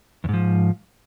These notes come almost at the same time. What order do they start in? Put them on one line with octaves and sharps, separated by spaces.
E2 G#2 F3